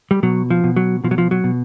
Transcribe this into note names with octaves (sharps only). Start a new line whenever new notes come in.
G3
B2 F#3
F3
B2
F#3
B2 F3
F#3
F3
F#3
B2